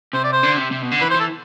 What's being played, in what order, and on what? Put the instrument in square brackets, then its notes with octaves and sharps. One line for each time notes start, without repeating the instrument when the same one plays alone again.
[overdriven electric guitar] C3 [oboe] C5
[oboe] D5
C5
[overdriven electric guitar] D3
C3
C3
B2
D3
[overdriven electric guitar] E3 [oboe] B4
[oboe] C5
[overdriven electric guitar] E3 [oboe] A4